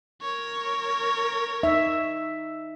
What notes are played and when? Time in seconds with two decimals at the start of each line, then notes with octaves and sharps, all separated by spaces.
0.22 A#4 C#5
1.63 D#4 E5